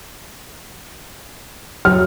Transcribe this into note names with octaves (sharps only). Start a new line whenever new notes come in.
F#3 F6